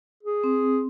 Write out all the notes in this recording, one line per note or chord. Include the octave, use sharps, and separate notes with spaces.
G#4
C4